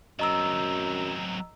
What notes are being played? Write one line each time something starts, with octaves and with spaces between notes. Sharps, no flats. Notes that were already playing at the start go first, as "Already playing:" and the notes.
F#2 F#3 C4 D#5 A#5 E6